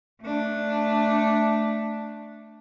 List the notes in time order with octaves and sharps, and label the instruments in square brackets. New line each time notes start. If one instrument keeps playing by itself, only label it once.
[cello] A3 D4